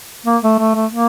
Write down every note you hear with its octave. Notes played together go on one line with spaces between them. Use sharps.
A#3
A3
A3
A3
A#3